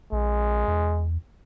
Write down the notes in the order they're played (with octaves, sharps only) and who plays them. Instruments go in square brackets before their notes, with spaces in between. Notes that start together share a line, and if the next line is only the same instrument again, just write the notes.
[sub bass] A#1 [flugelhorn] G#3
[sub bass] E2